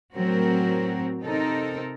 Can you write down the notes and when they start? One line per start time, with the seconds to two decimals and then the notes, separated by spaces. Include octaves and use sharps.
0.14 A2 F#3 C4 F#4 A#4
1.22 C3 C4 D#4 A4 A#4